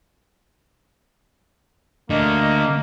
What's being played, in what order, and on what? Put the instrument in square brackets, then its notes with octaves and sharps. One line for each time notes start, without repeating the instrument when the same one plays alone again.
[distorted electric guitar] D3 A3 [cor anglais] A#3 [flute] D#5